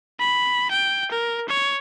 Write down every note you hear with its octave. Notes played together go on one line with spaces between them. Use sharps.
B5
G5
A#4
C#5